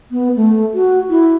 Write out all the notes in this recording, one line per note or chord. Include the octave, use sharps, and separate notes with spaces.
B3
A3
F#4
E4